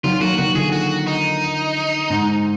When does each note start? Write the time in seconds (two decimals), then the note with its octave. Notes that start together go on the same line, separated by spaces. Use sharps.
0.04 D#3 F#3 F4
0.20 F#3 A#3 F#4
0.38 D#3 F#3 F#4
0.55 D3 F3 G#4
0.72 F#4
1.07 D#4
2.10 G#2